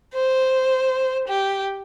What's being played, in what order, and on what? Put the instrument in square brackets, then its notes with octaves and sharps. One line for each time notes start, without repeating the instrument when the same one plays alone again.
[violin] C5
G4